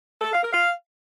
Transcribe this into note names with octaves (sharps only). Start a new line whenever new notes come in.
A4
F5
A#4
F5